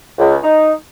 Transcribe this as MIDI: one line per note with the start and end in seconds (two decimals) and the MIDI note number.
0.19 0.36 37
0.42 0.72 63